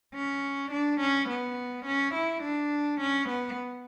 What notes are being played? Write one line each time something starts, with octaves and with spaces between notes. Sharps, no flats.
C#4
D4
C#4
B3
C#4
E4
D4
C#4
B3